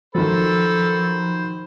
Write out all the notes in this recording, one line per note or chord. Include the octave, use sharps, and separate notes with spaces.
D#3 F3 F#3 A4 C5 B5